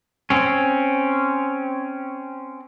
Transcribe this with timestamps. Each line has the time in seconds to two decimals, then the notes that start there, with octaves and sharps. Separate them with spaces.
0.30 C4 C#4